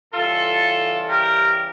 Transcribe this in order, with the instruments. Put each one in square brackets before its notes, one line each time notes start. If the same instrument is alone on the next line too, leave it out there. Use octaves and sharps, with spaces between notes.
[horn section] C#3 E3 G3 F4 A4
G4 A#4